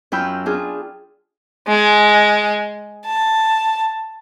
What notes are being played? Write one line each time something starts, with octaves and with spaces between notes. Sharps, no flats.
F#2 F4 G5 B5 E6 G6
D4 F4 G#4
G#3
A5